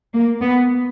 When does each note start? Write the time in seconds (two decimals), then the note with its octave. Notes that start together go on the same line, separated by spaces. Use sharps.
0.13 A#3
0.41 B3